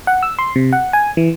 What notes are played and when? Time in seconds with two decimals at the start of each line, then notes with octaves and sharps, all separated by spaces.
0.07 F#5
0.23 E6
0.39 C6
0.56 C3
0.73 F#5
0.93 G#5
1.17 E3